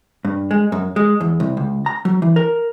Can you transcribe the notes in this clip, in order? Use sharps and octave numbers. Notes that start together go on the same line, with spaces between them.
G2
G#3
F#2
G#3
E2
C2
C#2
A#5
F#3
E3
A#4